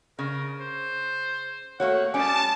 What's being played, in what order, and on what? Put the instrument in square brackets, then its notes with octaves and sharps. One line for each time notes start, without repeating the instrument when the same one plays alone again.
[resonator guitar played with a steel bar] C#3 [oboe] A#4
[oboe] C5
[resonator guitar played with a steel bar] A3 A#3 F#4 [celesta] C#5 [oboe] F#5
[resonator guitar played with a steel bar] G3 C#4 G#4 [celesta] G#5 [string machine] A5 [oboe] D6